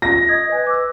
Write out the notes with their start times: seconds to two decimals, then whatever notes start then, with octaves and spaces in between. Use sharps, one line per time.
0.02 F4 A#6
0.29 D#5 D#6 G#6
0.52 B4 G#5
0.67 D6 E6